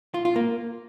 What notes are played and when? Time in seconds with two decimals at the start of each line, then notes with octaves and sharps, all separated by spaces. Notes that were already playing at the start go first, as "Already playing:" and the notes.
0.14 F4
0.25 F4
0.36 A#3